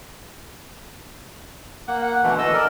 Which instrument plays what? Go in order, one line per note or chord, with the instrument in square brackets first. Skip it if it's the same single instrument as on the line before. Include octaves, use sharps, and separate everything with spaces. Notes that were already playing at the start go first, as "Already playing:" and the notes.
[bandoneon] A#3 [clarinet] F#5
[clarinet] F#5
[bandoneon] B2 D3 A3 [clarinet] E3
[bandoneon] E3 A4 E6 [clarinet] D#5
[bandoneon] A#4 D5